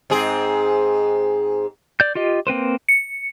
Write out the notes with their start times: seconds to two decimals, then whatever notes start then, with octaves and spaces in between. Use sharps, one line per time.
0.10 G#2 C4 G#4
2.00 D5 G6
2.15 F4 G4 D#5
2.47 A#3 C4 B4 C5
2.89 C#7